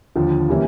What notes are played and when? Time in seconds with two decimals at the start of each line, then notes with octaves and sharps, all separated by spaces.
0.16 D#2 D3 F3
0.49 C3 E3 G3 A#3 C#4